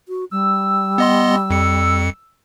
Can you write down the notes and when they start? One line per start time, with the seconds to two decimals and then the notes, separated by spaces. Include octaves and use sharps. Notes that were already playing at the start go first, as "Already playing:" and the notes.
0.08 F#4
0.31 G3 E6
0.98 B3 D#5 C6
1.50 F2 C#7